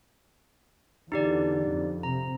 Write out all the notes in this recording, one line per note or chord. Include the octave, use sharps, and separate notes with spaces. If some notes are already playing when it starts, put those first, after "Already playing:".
E2 D3 D#4 G4 D5
F2
C3 A#5